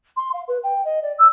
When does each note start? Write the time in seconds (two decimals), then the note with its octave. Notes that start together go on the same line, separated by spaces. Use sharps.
0.16 C6
0.33 F5
0.48 B4
0.63 G5
0.84 D#5
1.02 D5
1.18 E6